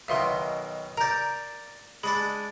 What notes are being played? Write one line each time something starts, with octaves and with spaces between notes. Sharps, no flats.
B1 B2 D#3 E5 F5 C6
A#4 D5 A#5 G6
G#3 D4 D5 B5